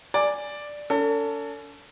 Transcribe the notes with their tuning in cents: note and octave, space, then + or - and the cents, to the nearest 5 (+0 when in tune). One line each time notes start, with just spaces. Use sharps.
D5 +0 G#5 +0
C#4 +45 A4 +35